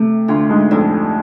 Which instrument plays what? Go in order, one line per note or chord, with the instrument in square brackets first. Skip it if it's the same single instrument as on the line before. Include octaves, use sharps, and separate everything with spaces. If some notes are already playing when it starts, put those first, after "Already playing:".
Already playing: [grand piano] C3 [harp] A3
[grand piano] D2 D3 [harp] F4
[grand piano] G#2 G#3
[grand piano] F2 F3 [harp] D4